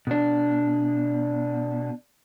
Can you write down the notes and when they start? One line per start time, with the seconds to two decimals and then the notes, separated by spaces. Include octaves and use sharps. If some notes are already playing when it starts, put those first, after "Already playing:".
0.07 B2 D4